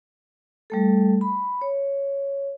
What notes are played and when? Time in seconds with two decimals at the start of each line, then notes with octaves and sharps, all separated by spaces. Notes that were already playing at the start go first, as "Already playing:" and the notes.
0.70 G3 A3 A4
1.21 B5
1.61 C#5